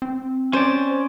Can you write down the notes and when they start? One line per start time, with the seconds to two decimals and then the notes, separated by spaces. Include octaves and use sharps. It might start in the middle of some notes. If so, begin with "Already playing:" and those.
0.02 C4
0.53 C#4 C5 D5